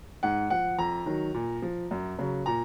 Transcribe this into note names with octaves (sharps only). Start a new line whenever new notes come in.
G#2 F#5
F3 F#5
F2 A#5
D#3 F#3
A#2
F3
F#2
C#3 F#3
A#2 A#5